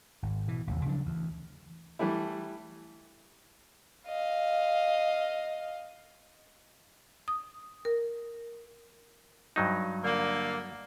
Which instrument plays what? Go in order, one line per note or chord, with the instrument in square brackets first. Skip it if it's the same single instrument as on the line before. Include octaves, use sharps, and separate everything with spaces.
[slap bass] G#1
B2 E3
A1 D#2 C3
C#3 F3 F#3 D4
D2 E3
[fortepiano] E3 G3 A3 E4
[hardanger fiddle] D#5 F5
[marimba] D#6
A#4
[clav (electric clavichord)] G2 F#3 D#4
[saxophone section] D3 A#3